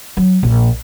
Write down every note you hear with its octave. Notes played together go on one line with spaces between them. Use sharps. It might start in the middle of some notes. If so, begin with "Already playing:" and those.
F#3
A#1